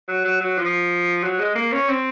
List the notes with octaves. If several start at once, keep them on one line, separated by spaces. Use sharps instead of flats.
F#3
F#3
F#3
F3
F#3
G#3
A#3
C#4
C4